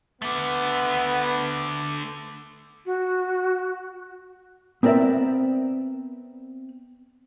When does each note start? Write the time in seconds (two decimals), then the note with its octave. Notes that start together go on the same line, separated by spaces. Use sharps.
0.22 D3 A3 B3
2.85 F#4
4.83 B3 C4 A#4 D5 E5